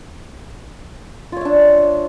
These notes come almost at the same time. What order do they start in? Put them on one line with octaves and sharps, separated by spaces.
F4 C#5 E5 D4